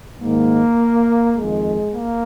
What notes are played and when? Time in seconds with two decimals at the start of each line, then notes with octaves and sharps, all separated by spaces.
0.21 G#2 D#3 A#3
1.36 F2 D#3 G#3
1.93 A#3